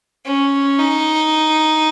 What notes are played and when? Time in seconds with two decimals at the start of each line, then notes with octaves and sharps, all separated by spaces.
0.25 C#4
0.78 D#4